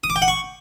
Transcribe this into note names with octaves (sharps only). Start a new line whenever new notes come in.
D#6
D6
G5
F#5
C#6